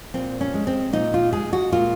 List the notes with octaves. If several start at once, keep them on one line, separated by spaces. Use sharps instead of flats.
A#2 C4
C#4
G#3
C4
A#2 D#4
F4
G#3 G#4
F#4
A#2 F4